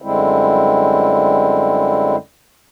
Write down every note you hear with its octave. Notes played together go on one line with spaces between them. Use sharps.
F#2 D3 G3 G#3 C4 E4